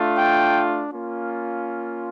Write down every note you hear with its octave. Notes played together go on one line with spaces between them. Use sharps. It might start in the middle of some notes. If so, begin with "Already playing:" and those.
Already playing: A3 D4 F4
G5
A#3 C#4 F4